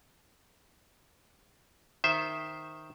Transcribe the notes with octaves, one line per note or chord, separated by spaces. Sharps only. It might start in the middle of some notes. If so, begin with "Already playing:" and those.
D#3 C5 E5